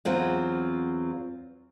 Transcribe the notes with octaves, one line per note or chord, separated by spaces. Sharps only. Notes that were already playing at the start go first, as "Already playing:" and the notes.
E2 F#3 C4 F4